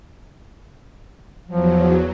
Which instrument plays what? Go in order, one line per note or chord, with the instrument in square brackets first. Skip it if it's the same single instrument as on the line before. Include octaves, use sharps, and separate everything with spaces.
[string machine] E2 F#3 [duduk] F3